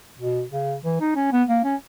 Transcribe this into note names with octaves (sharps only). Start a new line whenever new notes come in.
B2
C#3
E3
D#4
C#4
B3
A#3
C#4